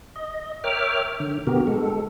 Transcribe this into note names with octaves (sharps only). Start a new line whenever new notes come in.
D#5
A#4 C#5 E5 G5 D6 F6
D3
B2 D3 B3 F#4 G4 A#4
G#3 A4